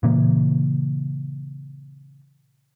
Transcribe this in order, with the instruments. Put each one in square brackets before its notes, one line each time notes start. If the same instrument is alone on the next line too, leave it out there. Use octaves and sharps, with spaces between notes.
[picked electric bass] A#2 C#3 E3 A#3